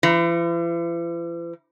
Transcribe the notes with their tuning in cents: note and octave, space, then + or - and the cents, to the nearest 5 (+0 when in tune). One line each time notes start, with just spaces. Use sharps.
E3 +45